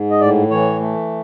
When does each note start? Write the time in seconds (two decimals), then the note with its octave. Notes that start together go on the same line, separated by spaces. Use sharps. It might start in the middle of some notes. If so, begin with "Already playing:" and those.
Already playing: G#2
0.11 D#5
0.21 A2 D5
0.50 E3 C#5
0.80 A3